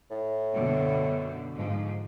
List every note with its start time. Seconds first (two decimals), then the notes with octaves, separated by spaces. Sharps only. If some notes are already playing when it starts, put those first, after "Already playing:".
0.10 A2
0.54 F#2 B2 D3
1.54 G#2 F3